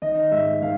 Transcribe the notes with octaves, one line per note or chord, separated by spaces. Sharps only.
D#3 D#5
G#2 E5
D#3 F5